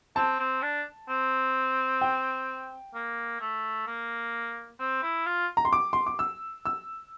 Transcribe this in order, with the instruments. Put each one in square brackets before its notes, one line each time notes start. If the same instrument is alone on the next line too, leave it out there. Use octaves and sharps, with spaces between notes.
[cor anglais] C4 [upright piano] A5
[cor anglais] C4
D4
C4
[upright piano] G5
[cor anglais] A#3
A3
A#3
C4
E4
F4
[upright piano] A#5
C6
D6
C6
D6
E6
E6